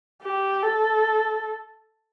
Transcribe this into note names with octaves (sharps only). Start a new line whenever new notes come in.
G4
A4